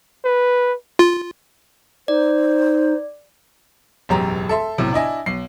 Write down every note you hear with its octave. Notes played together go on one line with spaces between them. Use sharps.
B4
F4
D#4 C5 D5
E1 A1 F#2 G4 A#5
A4 E5 C6
B1 A2 C3
D4 E4 D#5 G#5
B1 C7